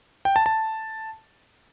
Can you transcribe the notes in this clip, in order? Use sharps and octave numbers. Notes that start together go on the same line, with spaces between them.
G5
A5
A5